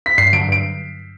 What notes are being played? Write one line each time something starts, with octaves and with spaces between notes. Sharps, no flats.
B6
G2 C7
D3 F#3 D7
G2 D7